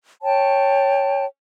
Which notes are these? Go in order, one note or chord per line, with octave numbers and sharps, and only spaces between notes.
C#5 G5 A5